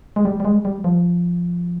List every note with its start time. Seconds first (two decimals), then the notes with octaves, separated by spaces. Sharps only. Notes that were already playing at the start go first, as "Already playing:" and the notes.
0.16 G#3
0.25 G3
0.40 G3
0.45 G#3
0.65 G3
0.84 F3